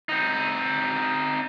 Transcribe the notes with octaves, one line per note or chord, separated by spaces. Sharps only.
C4 D#4